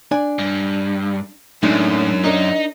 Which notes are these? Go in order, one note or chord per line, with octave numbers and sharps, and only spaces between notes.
D4 D5 G#5
G2
F#2 A2 G#3 D4 D#4
D4 D#4 A#4 D#5